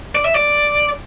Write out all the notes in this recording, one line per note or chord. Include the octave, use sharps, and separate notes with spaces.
D5
E5
D5